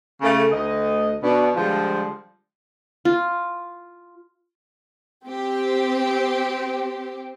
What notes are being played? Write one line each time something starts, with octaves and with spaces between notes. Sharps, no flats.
C#3 A3 A#3
D2 D#5
B2 B3 D4
D3 F3 G3 G#3 F4 C5
F4
C4 G4